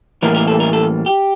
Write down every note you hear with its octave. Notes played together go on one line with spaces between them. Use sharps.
A2 E3 G3 A#3 A#4
A#4
A4
A#4
A4
G4